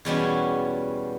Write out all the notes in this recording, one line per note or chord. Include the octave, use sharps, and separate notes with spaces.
E2 B2 G3 C#4